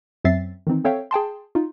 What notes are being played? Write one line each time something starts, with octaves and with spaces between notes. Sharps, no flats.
F#2 F#3 C4 E5 A6 C7
D#3 E3 C4 D#4
C4 A4 C#5 E5 F5 G5
G#4 G5 A5 C6
D#4 F4